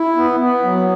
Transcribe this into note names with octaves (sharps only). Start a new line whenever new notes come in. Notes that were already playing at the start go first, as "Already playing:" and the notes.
Already playing: E4
B3
B3
F#3